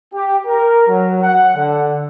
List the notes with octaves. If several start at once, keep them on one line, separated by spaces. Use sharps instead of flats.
G4
A#4
F#3
F#5
D3